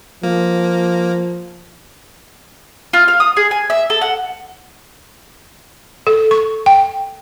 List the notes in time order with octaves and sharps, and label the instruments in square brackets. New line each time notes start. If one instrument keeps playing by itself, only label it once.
[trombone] F3 [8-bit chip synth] A#3
[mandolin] F4
F5
D#6
G#4
G#5
E5
A4
F#5
[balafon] A4
C#6
G5